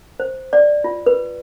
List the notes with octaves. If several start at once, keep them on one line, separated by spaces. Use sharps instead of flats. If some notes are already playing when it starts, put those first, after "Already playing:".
C5
D5
F4
B4